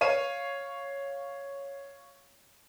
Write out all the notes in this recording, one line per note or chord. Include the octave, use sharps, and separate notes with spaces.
C#5 F5 D#7